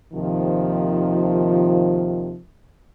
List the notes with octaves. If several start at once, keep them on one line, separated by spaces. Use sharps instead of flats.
D#2 C3 D#3 F3